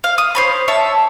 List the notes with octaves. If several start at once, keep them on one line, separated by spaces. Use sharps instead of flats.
F5
D#6
C5 C#5 B5
C#5 E5 A5